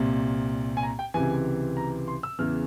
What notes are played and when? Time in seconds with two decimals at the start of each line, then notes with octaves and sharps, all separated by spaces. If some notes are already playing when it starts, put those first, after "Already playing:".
Already playing: C2 A#2
0.77 G#5
0.83 A#5
0.99 G5
1.14 C#2 C3 E3 G#5
1.77 A#5
2.08 C6
2.23 E6
2.39 E2 C#3 E3 F6